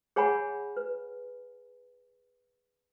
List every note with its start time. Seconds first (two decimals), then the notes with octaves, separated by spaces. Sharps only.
0.16 G#4 C#5 F#5 G#5 B5
0.77 B4